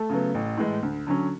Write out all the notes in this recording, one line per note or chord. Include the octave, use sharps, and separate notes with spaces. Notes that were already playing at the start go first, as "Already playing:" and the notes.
Already playing: A3 A4
C#3 F#3 B3
A1
A2 E3 G#3
D2
D3 F#3 C#4